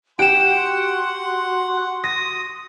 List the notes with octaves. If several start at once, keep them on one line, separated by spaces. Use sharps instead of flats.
F#4 G4 F#5 C6 D7 E7
D#6 A#6